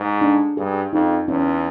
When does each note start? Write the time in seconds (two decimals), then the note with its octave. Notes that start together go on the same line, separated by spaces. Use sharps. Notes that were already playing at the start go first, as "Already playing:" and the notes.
Already playing: G#2
0.21 D4
0.57 G2 G#4
0.93 F2 D#4
1.28 E2 C#4